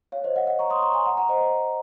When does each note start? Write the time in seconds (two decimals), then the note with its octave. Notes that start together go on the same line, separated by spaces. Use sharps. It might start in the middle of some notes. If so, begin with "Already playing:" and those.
0.12 C#5 F5
0.24 C5 D#5
0.36 D#5 F#5
0.47 D#5 F#5
0.59 A#5 C#6
0.70 C6 D#6
0.82 A#5 C#6
0.94 G#5 C6
1.06 F#5 A#5
1.17 F#5 A#5
1.29 C5 D#5
1.41 C5 D#5